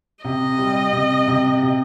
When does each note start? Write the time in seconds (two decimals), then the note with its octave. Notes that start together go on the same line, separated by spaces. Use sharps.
0.24 C3 D#5
0.58 G3
0.93 C3
1.27 C3
1.63 C3